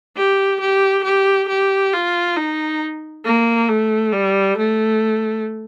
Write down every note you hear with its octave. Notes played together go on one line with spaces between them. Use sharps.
G4
G4
G4
G4
F4
D#4
A#3
A3
G3
A3